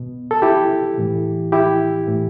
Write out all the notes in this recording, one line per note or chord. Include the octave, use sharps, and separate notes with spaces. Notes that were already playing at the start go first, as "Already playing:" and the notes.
Already playing: B2
A4
E4 G4
A2 E3
E4 G4
A2 E3